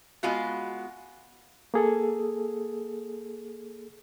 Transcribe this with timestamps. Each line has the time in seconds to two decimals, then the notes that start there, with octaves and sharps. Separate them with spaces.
0.23 G#3 B3 F4 F#4
1.74 A#3 G#4 A4